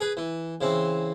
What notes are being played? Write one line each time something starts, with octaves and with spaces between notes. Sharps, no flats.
G#4 B4
E3
C#3 E3 C4